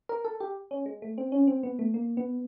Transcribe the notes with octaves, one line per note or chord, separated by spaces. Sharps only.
A#4
A4
G4
C#4
G#3
A3
C4
C#4
C4
B3
A3
A#3
B3